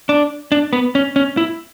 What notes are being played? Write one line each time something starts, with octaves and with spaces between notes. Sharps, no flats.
D4
D4
B3
C#4
C#4
E4